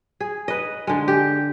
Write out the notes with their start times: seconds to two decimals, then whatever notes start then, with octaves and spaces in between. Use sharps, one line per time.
0.20 G#4
0.48 B4 D#5
0.87 D3 G#3
1.08 G4